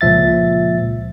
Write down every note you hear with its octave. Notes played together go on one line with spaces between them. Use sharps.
C#2 A#2 F3 E5 A6